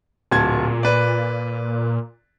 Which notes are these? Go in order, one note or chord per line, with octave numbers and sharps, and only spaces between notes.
D1 A#2 A5 G#6
B4 D5